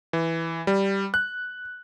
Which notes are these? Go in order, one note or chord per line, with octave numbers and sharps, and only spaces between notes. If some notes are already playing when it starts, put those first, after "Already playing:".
E3
G3
F#6